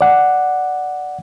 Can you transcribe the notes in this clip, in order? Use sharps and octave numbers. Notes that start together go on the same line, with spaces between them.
D5 F#5